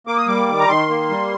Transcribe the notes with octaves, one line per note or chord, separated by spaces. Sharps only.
A#3 D6
D#6
G3 D6
D#3
A#5
D#3 C6
A#3
G3